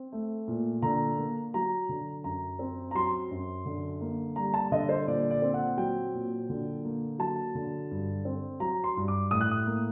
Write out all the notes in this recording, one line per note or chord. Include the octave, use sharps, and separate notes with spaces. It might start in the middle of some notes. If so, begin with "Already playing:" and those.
Already playing: C4
A3
A#2
D3 A#5
A#3
F#3 A#5
D3
F#2 A#5
C4
A#5
F#3 C6
F#2
D3
A#3
G3 A#5
A5
D3 D#5
C5
A#2 D5
D5
C4
F#5
F#3 G5
A#2
D3
A#3
F#3 A5
D3
G2
C4
F#3 A#5
C6
G2
D6
A2 D#6
F#6
D#6
A#3